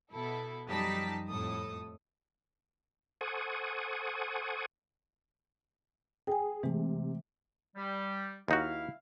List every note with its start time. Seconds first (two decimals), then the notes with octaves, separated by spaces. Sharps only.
0.12 B2 E4 A4
0.69 F#2 F3 G3 D#4 A5 B6
1.28 F2 A2 A4 D#6
3.21 A4 C5 F#5 G#5 C#6 D#6
6.27 G#4 G5 G#5
6.63 C3 E3 G#3 A3
7.76 G3
8.48 D#2 D#4 E4 F#4 F5